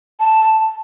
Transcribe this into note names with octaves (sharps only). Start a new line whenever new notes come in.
A5